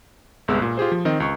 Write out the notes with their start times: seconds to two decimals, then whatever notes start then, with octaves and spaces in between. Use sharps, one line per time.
0.48 G1 C2 G#3 B3 E6
0.62 A#2
0.77 F4 G4 G#4 C5
0.92 F3
1.05 D#3 C4 D#5
1.20 C#2 C#6